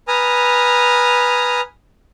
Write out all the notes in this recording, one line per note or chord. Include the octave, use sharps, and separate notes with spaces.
B4 G#5 A#5 D#6 F6